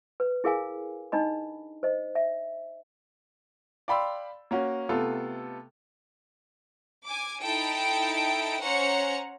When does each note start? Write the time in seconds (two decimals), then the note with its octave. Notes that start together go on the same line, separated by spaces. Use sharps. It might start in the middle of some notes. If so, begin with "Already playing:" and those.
0.20 B4
0.44 E4 G#4 A#4 F5 G#5
1.12 D4 D#4 D#5 B5
1.83 C5 D#5
2.15 E5
3.88 D5 F5 G5 B5 C6 E6
4.51 A#3 C#4 F#4
4.89 C3 A3 B3 F4 A4
7.05 G#5 D6
7.42 D#4 E4 A4 G5 D7
8.61 C#4 C5 C#5 F#5 A#5 C#7